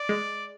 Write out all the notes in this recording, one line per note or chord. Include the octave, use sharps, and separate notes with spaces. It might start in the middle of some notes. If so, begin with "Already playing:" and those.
Already playing: D5
G#3